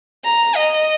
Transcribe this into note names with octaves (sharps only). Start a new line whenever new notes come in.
A#5
D#5